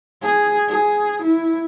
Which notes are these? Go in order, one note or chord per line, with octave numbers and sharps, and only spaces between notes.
G#4
G#4
E4